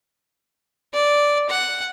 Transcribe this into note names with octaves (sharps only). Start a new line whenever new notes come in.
D5
F#5